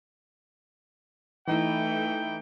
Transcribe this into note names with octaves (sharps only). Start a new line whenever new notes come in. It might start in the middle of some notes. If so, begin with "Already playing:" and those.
E3 A3 D#4 E4 G5